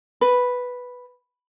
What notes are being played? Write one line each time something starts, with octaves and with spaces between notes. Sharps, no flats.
B4